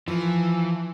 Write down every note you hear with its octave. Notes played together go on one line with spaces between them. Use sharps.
E3 F3